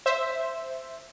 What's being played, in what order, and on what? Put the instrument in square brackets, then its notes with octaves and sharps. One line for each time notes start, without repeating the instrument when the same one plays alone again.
[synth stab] C5 E5